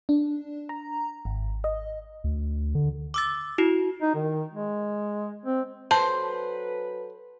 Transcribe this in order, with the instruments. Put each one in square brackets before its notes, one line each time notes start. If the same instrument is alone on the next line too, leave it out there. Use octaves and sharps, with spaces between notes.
[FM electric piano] D4
A#5
G#1
D#5
[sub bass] D2
D3
[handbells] D6 E6 A6
E4 F#4
[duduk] D#4
D#3
G#3
C4
[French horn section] F#3 A4 B4 [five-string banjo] C5 [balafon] A5